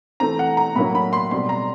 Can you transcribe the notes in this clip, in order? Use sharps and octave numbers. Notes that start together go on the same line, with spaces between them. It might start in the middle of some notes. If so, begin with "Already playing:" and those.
E3 A3 C4 A#5
F#5
A#5
A2 F#3 A#3 C#4 B5
B5
C6
B2 G3 C4 C6
A#5